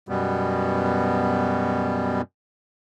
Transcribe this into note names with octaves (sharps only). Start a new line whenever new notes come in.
F#2 B2 G3 B3